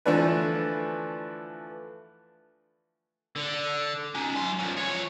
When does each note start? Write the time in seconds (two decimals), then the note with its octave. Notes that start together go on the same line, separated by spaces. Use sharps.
0.06 D3 E3 F3 A3 D4 B4
3.36 D3
4.15 C#4 D#4
4.36 F#3 C6
4.59 F3 C#4
4.78 F3 C#5